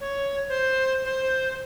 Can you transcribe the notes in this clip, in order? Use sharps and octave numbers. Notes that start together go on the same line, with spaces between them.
C#5
C5
C5